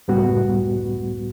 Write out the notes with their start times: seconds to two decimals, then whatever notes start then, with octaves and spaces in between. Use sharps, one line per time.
0.08 C#2 F#2 A2 G3 B3 F#4